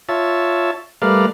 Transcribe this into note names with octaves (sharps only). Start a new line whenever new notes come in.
F4 C#5 E5 A5
G3 A3 A#4 B4 D5 F5